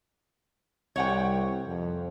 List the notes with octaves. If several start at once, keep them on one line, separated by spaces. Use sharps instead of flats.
C2 C#5 F#5 G5
F2